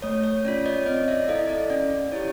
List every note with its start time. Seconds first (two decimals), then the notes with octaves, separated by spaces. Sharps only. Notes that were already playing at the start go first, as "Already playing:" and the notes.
0.02 A3 C#5
0.24 C#5
0.45 C#4 F4 D5
0.66 C#5 D#5
0.86 C4 C#5 D#5
1.08 D5 E5
1.28 E4 A4 D#5 F5
1.49 D5
1.70 C#4 D5
2.12 E4 G4 C#5